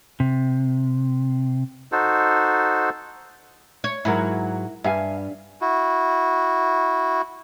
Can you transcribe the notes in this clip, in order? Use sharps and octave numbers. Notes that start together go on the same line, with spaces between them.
C3
D#4 F#4 A4 C5
C#5
G#2 F#3 E4 A#4
G2 E5 F5 G#5
E4 F#4